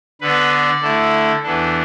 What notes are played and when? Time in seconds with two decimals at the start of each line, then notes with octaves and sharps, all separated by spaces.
0.21 D3 B3 D4 B4
0.52 D5
0.82 D3 A3 E4 A4
1.43 E2 E3 B3 D4 A4